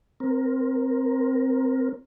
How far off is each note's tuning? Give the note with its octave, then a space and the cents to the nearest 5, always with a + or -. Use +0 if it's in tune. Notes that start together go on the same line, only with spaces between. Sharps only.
C4 +0 A#4 +10